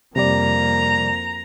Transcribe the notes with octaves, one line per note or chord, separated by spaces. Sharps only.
F2 C3 G3 A#3 D5 A#5